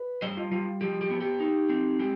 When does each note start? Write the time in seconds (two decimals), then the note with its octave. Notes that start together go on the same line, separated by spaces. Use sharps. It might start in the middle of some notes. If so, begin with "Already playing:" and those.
Already playing: B4
0.22 G3 C5 D#5
0.37 F4
0.52 G3 F4
0.81 F3 G4
1.01 G4
1.10 B3
1.20 G4
1.40 D#4
1.69 C4
1.99 G#3 G4